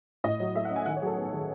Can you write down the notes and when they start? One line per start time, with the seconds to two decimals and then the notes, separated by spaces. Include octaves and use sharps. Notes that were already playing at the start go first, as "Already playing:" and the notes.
0.24 A2 D#5
0.40 F#3
0.55 A3 E5
0.65 F#5
0.70 C#4
0.76 G#5
0.86 D#3 F#5
0.97 C#5
1.02 F#3 G#4
1.07 A4
1.17 B3
1.32 D#3